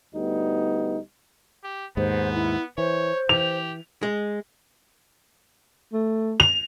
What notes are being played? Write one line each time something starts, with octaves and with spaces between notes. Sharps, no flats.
D2 G3 B3 D#4
G4
D#2 G#2 B3 C5
E4
E3 C5 C#5
E3 G4 F7
G#3
A3
F7